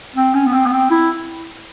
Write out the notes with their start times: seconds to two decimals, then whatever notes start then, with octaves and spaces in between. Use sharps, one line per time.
0.16 C4
0.34 C#4
0.46 B3
0.53 C4
0.66 B3
0.73 C4
0.91 E4